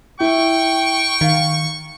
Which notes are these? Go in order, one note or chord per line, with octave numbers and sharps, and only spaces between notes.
E4 G5 C#6
D#3 F5